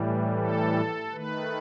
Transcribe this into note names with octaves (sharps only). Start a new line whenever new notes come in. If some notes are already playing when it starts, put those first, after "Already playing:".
Already playing: A2 E3 G3
A4
D#3 A3 B4